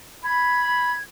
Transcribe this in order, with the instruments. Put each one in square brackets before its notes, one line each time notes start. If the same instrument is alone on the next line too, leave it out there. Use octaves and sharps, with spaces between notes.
[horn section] B5 [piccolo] G#6